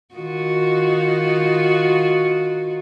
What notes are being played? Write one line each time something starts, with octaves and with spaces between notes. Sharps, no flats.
D#3 F4 F#4